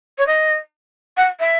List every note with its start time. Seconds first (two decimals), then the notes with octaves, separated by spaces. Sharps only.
0.18 C#5
0.27 D#5
1.17 F#5
1.40 E5